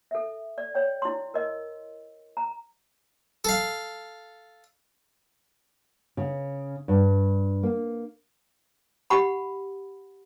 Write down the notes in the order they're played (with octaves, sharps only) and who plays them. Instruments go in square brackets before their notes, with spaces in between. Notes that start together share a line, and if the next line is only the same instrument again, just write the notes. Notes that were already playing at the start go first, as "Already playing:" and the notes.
[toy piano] A4 E5
D5
C#5 G5
E4 C6
A#4 D#5
A#5
[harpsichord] A4 F5
[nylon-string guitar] C#3
G2
A#3
[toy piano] G4 F#5 B5